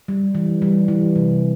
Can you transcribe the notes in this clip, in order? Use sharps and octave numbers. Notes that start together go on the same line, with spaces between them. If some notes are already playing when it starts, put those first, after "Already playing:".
G3
E3
G3
E3
C3